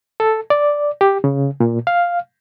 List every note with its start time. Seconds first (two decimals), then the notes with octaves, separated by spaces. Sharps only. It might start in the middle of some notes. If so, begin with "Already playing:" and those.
0.20 A4
0.50 D5
1.01 G4
1.24 C#3
1.60 A#2
1.87 F5